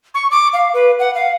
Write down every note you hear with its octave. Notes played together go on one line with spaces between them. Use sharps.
C#6
D6
F5
B4
F#5
F5